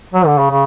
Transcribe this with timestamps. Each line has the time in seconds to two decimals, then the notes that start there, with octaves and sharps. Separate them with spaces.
0.14 F#3
0.26 D3
0.39 C#3
0.51 C#3